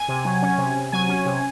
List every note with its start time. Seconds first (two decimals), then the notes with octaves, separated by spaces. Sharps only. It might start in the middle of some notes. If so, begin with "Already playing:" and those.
Already playing: G#5
0.08 C3
0.25 F#3
0.42 C#4
0.58 C3
0.75 C3
0.92 F#3 G#5
1.09 C#4
1.26 C3